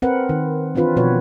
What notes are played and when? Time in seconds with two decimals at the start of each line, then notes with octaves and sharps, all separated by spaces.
0.02 C4 A#4 B4 F#5
0.29 D#3
0.75 E3 C4 D4 F4 B4
0.96 B2 F3 F#4 B4 C#5